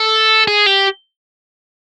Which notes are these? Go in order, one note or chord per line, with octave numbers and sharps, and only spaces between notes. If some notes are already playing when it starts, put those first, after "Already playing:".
Already playing: A4
G#4
G4